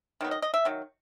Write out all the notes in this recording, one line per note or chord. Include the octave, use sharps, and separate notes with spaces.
D#3 F#3 B3
D#5
D#5
E5
D#3 F#3